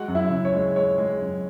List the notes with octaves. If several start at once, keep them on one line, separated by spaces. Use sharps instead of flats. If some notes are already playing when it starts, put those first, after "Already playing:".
Already playing: G#3 F#4 F#5
F#2
E4 E5
C#3
C#5
G#3
G#3 C#5
G#3
F#2